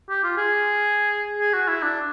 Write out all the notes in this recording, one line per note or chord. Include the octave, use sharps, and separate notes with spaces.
G4
F4
G#4
G#4
F#4
E4
D4